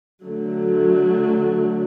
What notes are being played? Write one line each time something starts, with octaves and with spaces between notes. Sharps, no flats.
D3 F#3 A3